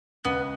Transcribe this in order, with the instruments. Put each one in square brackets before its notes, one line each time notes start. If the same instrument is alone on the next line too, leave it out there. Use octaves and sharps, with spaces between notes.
[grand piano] C#2 C#3 [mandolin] B3